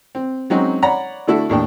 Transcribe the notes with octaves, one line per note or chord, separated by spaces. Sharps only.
C4
F#3 G#3 C4 C#4 D#4 F#4
C#5 D5 F#5 A#5 B5
D3 A3 D4 E4 F#4 A4
D#2 A2 D4 G5